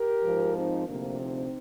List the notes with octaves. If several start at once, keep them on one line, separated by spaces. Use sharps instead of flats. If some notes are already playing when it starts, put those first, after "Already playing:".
Already playing: G4 A#4
G#2 F3
C4 D#4
D2 C3 F3 A#3 D4
C4 D#4